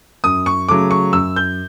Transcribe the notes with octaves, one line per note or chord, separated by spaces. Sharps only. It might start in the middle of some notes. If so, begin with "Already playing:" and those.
F#2 D#6
C#6
C#3 F#3 A3 D6
C#6
F#2 E6
G6